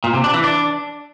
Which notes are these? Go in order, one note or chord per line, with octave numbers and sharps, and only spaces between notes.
A#2
C3
D4
E3
D4